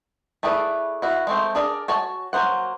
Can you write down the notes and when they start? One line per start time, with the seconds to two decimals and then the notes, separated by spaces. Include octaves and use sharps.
0.43 A3 E4 G#4 B4 D5
1.02 E4 F#4
1.27 G#3 A3 C4
1.55 D4 G#4 A#4 D5
1.88 F#4 C#5 G#5 A5
2.33 F#3 A#3 C5 F#5